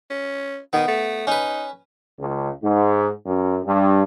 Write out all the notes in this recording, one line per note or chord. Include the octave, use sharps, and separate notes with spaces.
C#4
D#3 B3
A3
C#4 D#4 B4
C#2
G#2
F#2
G2